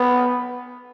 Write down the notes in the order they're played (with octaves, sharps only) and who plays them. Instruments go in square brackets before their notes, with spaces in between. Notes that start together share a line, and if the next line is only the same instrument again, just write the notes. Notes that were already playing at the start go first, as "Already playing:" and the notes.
Already playing: [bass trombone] B3